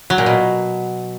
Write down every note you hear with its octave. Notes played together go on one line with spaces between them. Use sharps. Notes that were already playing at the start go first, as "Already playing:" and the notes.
F#3
A#2
B2